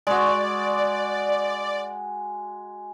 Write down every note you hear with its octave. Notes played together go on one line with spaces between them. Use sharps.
G#3 F#4 D5